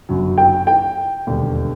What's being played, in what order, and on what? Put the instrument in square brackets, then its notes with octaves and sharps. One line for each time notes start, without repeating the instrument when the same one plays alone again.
[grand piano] G1 F#2 C#3 F#3
[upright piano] G5
G5
[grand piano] E1 D#2 D3 G3